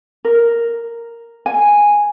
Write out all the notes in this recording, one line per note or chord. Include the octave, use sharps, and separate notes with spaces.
A#4
G#5